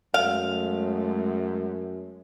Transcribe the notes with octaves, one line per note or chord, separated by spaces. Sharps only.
F#2 G#3 A3 F5